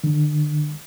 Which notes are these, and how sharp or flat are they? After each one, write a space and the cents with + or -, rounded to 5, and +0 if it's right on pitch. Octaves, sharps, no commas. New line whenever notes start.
D3 +35